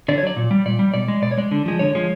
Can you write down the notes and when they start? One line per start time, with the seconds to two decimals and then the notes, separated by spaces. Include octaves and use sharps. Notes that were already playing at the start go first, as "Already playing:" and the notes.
0.08 D3 D5
0.18 C#5
0.23 F#3 D5
0.36 A#2
0.51 G3
0.65 A#2 D5
0.79 G3
0.94 B2 D5
1.08 G#3
1.22 B2 D5
1.31 C#5
1.38 G#3 D5
1.51 D3
1.66 F3 G#3
1.79 D3 C#5
1.95 F3 G#3